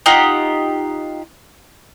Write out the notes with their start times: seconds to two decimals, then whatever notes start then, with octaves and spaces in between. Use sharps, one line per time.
0.06 D#4 F4 G4 F#5